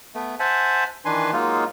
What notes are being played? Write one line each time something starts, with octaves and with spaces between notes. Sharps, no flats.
A3 B3
C5 E5 F#5 G#5 A5
D#3 E3 D4 B4 G#5 C6
F#3 G#3 A#3 D#4 F4